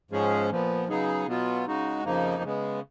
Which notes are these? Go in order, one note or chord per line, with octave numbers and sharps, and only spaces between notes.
G#2 F3 G#3 C#4 G#4
A#2 F3 B3
C#3 F#3 B3 D#4 G#4
B2 F#3 B3 F4
C#3 G#3 D#4 F#4
F2 C#3 F3 A#3 D#4
C#3 G#3 B3